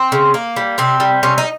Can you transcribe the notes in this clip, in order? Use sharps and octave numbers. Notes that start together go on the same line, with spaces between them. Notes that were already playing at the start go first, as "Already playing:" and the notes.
Already playing: C4
C#3
A#3
G3
C3 C4
G3
C3 C#4
D#4